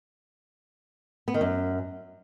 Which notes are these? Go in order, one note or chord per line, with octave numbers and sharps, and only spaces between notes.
B3
D#3
F#2